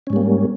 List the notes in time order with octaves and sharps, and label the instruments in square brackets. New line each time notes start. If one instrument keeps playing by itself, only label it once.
[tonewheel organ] C#4
G#2
G3
A#3